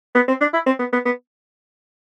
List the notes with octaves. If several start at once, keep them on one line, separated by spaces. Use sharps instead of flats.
B3
C4
D4
E4
C4
B3
B3
B3